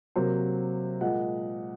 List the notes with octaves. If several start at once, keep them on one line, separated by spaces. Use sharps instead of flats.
C3 F#3 A#3 C5
A#2 G#3 F#5